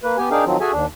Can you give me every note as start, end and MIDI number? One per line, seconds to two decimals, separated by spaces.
0.03 0.17 58
0.03 0.17 71
0.18 0.29 59
0.18 0.29 67
0.18 0.29 80
0.31 0.45 62
0.31 0.45 63
0.31 0.45 68
0.31 0.45 70
0.31 0.45 77
0.31 0.45 79
0.46 0.57 51
0.46 0.57 53
0.46 0.57 54
0.46 0.57 60
0.61 0.72 66
0.61 0.72 68
0.61 0.72 69
0.61 0.72 76
0.61 0.72 80
0.72 0.86 39
0.72 0.86 62